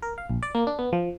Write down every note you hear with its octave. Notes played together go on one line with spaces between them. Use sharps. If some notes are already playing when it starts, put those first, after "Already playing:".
A#4
F5
A#1
D5
A#3
D4
B3
F3